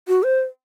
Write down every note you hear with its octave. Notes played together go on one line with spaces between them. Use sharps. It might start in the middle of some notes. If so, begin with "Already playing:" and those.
F#4
C5